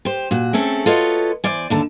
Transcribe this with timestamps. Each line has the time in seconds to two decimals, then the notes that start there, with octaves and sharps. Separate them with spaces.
0.05 G4 C5
0.31 A#2 F#4
0.53 A3 C4 C#4 G#4 A4
0.86 F4 F#4 A4 B4 C#5 D#5
1.44 E2 C5 D5 G#5
1.70 D#2 D3 A5